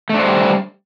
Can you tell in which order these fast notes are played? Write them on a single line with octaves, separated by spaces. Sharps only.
A3 D4 C5 G3